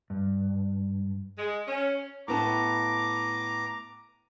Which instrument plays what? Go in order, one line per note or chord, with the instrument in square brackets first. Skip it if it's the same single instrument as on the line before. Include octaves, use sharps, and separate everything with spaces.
[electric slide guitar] G2
[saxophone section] G#3
C#4
[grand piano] A2 B3 A5 [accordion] A#5 D6